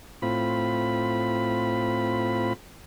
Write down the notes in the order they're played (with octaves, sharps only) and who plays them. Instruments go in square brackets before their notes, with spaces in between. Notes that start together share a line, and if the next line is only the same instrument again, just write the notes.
[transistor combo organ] A2 C4 F4 B5